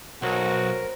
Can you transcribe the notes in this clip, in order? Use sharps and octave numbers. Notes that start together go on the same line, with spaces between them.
B1 F#4 A#4 C5 C#5